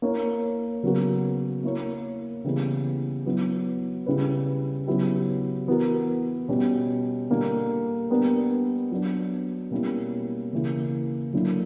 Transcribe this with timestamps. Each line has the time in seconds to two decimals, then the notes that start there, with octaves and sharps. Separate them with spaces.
0.02 A#3 E4 A#4 C#5
0.83 C#3 F#3 B3 F#4 A#4
1.64 A#3 E4 A#4 C#5
2.44 C#3 E3 G3 B3
3.26 F#3 B3 E4
4.06 C#3 G3 C#4 E4 B4
4.87 C#3 F#3 B3 E4 G4
5.67 E3 B3 F#4 A#4
6.48 B2 G3 C#4
7.30 D3 G3 A#3
8.10 G3 B3 D4 A#4
8.91 F#3 B3 D4
9.71 B2 G3 A#3 C#4 E4
10.53 C#3 E3 A#3
11.33 D3 F#3 A#3 E4